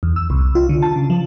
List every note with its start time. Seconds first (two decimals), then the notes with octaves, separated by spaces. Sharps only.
0.03 E2
0.16 E6
0.30 C2
0.55 F4
0.69 D3
0.83 A5
0.96 C#3
1.10 F3